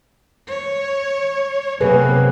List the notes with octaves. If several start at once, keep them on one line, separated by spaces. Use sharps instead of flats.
C#5
F#2 C3 A#3 G#4 B4